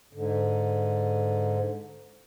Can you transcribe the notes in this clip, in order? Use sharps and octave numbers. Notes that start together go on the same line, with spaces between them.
G#2 D3